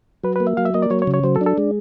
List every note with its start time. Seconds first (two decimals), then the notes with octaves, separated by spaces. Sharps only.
0.24 F#3 B4
0.36 A#3 B4
0.47 E5
0.57 F#3 F5
0.65 E5
0.74 A#3 D#5
0.82 D5
0.90 F#3 C#5
1.02 C#5
1.07 C#3
1.14 C#5
1.24 F#3 C5
1.36 A4
1.41 D4
1.46 A4
1.58 G#3